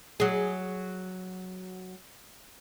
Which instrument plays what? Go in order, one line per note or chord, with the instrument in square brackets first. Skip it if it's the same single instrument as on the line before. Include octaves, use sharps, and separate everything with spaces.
[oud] F#3 G#4